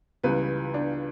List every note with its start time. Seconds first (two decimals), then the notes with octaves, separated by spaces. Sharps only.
0.24 C#2 C#3 E3 G3 B4
0.74 D4